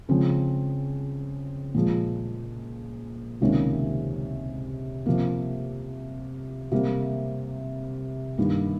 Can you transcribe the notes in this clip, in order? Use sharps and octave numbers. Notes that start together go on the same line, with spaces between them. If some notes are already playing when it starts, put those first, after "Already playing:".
C#3 F3 G#3 C4
A#2 F3 G#3
C#2 C3 D#3 A#3 C#4
C3 F3 A#3
C3 G3 A#3
G2 D#3 A#3